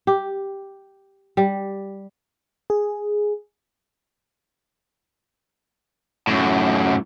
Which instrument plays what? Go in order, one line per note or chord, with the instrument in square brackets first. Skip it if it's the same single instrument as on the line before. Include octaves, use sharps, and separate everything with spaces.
[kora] G4
G3
[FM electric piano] G#4
[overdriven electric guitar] F#2 A2